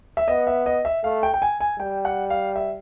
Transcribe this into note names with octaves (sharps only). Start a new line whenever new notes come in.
E5
B3 D#5
E5
D#5
E5
A3 F5
G5
G5
G#5
G#5
G3 G5
F#5
F5
E5